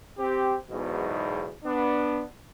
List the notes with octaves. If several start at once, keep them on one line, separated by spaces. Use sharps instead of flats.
C4 G4
B1 E2 G#2 B2
B3 D4